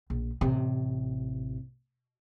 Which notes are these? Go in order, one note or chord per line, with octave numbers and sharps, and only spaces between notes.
A#1
A1 C3